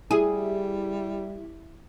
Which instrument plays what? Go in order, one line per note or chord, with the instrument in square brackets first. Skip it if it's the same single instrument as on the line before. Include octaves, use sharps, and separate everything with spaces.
[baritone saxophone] G3 [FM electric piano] E4 G4 E5 [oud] G#4